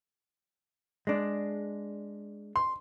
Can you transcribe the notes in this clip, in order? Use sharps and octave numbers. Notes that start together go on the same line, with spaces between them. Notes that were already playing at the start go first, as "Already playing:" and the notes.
G#3 D4
C6